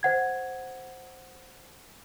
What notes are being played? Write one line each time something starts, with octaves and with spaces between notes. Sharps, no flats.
C5 F#5 G#6